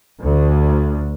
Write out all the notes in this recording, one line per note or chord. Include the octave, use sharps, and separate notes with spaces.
D2